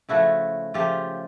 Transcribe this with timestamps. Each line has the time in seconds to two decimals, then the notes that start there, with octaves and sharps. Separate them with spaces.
0.09 C#3 F3 A3 E4 F#4
0.74 C#3 F3 A3 F4 G4